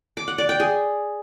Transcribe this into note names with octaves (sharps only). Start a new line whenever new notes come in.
D6
F#5
D5
G5
G#4